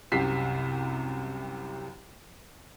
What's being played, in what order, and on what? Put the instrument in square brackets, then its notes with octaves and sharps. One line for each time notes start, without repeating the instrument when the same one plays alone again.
[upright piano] C2 F#2 C3 G4 B6 C7